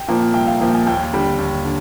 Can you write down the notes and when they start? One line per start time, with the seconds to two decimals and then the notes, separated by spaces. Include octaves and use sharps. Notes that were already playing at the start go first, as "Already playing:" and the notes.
Already playing: G5
0.08 A#2 F3 A#3
0.34 C2 G5
0.47 F5
0.61 A#2 F3 A#3
0.74 G#5
0.87 D#2 G5
1.13 D3 G3
1.39 D#2
1.64 D3